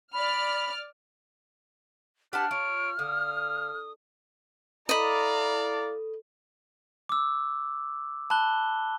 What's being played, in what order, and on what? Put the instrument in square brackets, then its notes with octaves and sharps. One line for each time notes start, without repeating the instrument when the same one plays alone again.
[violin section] D5 F6 [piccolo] B5
[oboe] D4 [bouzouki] G4 B4 A5 [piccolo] F#5 [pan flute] F6
[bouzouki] F4 [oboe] C#5 [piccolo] D7
[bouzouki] D3 [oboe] F5 [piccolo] D#6
[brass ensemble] E4 D5 F5 [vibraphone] A4 [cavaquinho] D#5 B5 [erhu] A#5
[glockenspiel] D6 E6
A5 B5 F#6 G7